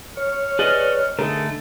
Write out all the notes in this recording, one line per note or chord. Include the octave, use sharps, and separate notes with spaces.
C#5 F6
G#4 B4 D5 D#5
D3 A3 D#4 G#4 A#4